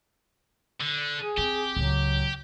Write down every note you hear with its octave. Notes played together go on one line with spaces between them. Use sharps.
D3
G#4
C4 G4
C#2 A2 F#3